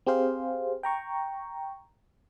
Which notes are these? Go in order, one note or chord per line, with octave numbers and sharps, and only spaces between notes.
C4 G4 G#4 C5 F5
G5 A#5 C#6